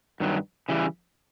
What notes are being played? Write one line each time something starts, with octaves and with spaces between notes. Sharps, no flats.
G2 D#3 F#3
C#3 E3 G3